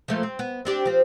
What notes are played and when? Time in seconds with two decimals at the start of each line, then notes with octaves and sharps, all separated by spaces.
0.08 F3 A3 A#3
0.23 C4
0.39 B3
0.65 C4 D4 G4
0.85 F3 C4